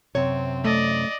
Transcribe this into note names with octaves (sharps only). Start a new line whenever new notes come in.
F#2 C3 C4 C#5
A3 D5 D#5